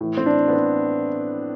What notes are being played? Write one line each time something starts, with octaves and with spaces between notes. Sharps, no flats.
A2 E3
C4
D4
B3
C4